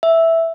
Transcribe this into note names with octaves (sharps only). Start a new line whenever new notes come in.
E5